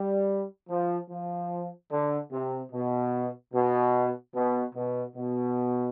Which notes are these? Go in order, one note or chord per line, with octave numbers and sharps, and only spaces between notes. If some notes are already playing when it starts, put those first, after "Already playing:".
Already playing: G3
F3
F3
D3
C3
B2
B2
B2
B2
B2